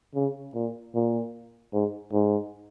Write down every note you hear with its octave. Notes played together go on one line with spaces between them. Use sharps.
C#3
A#2
A#2
G#2
G#2